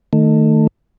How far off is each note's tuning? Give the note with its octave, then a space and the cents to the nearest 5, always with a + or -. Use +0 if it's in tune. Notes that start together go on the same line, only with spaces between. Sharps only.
D#3 +0 A3 +15